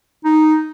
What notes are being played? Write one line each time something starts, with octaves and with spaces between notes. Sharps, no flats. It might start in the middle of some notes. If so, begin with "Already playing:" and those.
D#4